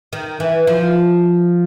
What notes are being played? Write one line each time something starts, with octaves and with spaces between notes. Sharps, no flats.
D#3
E3
F3